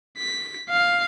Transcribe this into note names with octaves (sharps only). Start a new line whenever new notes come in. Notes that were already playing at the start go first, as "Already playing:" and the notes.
B6
F5